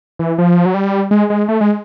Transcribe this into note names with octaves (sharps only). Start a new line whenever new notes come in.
E3
F3
F#3
G3
G#3
G#3
A3
G#3